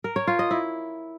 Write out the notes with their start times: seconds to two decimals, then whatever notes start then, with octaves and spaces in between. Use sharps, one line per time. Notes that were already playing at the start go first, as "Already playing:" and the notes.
0.04 A#4
0.16 C#5
0.27 F4
0.39 D#5
0.51 E4